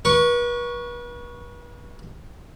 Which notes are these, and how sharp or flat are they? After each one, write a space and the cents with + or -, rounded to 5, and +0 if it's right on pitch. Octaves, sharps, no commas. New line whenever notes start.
B4 -40 C#6 +0